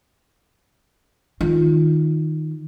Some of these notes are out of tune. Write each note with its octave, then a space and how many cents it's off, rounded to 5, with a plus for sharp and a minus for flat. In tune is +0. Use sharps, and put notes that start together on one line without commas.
D#3 +0 F4 +0